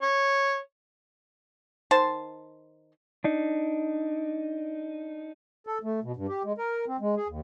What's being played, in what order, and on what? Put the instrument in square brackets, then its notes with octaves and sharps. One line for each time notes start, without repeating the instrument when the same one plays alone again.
[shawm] C#5
[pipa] D#3 C5 A5 C6
[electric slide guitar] D4 D#4
[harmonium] A4
A3
B2
G2
G4
G#3
A#4
C4
G#3
G#4
D#2